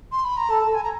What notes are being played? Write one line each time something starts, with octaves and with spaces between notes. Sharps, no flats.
C6
B5
A#5
A4 A5
G#5
A#5